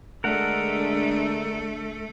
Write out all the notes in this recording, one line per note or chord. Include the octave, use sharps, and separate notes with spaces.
D3 G#3 A3 D4 A4 A#4 F#5